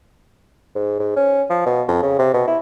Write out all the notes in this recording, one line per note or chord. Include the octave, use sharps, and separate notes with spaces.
G#2
G#2
C#4
F3
B2
F2
C#3
C3
B2
E4